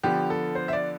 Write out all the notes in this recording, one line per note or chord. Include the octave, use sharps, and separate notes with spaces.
D3 F3 B3 G4
A4
C5
E5
D5